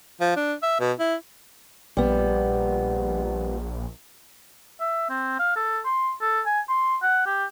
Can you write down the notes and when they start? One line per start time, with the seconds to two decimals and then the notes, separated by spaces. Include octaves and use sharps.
0.20 F3
0.36 D4
0.62 E5
0.80 B2
0.99 E4
1.97 A#1 G3 B3
4.80 E5
5.09 C4
5.39 F5
5.56 A4
5.85 C6
6.21 A4
6.46 G#5
6.69 C6
7.02 F#5
7.26 G4